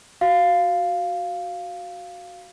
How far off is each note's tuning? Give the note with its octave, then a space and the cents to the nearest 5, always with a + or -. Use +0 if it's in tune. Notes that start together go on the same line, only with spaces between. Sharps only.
F#4 +0 F5 +0